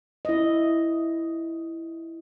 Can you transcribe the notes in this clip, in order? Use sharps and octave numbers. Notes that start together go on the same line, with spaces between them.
E4 D#5